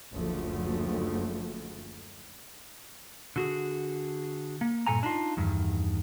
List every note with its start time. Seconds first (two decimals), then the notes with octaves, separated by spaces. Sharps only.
0.11 F#1 D2 F3 A3
3.36 D3 F#4 G#4
4.61 A#3
4.87 G2 A#2 C#3 A4 G#5 A#5
5.03 D4 D#4 F4
5.37 E2 G2 D#3